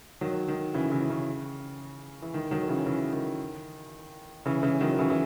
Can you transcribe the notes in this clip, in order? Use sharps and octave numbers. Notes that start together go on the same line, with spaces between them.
D#3 F#3
D#3
C#3 E3
C#3 E3
C#3
E3
D#3
D#3 F#3
C#3 E3
C#3 E3
D#3
C#3 E3
C#3 E3
D#3 F#3
C#3 E3
E3